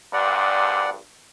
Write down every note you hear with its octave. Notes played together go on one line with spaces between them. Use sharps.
A#1 G2 D5 F#5